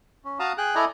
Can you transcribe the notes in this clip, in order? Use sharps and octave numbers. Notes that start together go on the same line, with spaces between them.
C#4
F#4 F5 A5 A#5 D#6
G#4 G5 F#6
E4 A4 D5 D#5 G#5 A#5